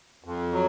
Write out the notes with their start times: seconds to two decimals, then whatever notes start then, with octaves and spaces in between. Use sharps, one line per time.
0.24 F2
0.52 F#3